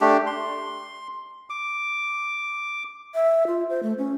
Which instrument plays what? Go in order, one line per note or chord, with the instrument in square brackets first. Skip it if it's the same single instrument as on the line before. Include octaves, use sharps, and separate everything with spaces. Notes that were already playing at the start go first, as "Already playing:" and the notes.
[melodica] A3 D4 G4
C6
D6
[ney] E5
F4
C5
A3
C#4